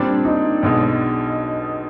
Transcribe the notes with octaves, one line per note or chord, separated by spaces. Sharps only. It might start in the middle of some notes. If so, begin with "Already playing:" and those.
Already playing: A#2 G3 C4 D4
D#4
B1 B2 G#3